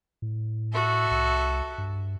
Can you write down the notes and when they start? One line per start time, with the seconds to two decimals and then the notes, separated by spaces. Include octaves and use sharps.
0.22 A2
0.73 F#4 A4 E5
1.11 C2
1.78 G2